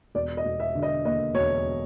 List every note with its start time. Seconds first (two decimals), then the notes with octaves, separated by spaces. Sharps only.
0.15 E1 D5
0.37 D#5
0.45 E1
0.60 E5
0.75 D3
0.83 D#5
1.05 D#2 D#5
1.35 E1 C#5